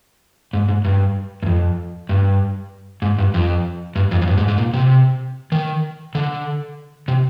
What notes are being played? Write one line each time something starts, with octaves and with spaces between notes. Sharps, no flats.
G#2
G#2
G2
G2
F2
G2
G#2
G2
F2
G2
F2
F2
G2
G#2
G#2
A#2
C3
D#3
D3
C3